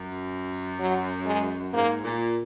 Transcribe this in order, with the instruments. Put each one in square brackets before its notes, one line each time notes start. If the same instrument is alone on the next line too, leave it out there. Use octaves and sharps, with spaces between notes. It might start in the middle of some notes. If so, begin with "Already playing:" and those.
Already playing: [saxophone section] F#2
[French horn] F#3
G#3
[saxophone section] G#2 [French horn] A#3
[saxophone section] A#2